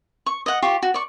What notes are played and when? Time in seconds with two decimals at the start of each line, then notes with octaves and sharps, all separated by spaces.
0.26 C#6
0.46 D#5 F#5
0.62 F4 G4 C#6
0.82 F#4
0.94 D5 C#6